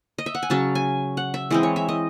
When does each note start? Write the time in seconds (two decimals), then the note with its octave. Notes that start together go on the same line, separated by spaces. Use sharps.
0.18 D#5
0.26 E5
0.35 F#5
0.43 G#5
0.50 C#3 F#3 C#4 A5
0.75 G#5
1.17 F#5
1.34 E5
1.51 E3 G#3 C4 D#5
1.63 C#5
1.76 E5
1.89 D#5